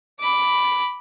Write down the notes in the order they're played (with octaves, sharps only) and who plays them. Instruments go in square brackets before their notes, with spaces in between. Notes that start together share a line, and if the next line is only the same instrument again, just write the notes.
[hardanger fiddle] B5 D6